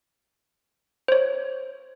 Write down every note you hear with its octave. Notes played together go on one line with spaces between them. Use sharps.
C5 C#5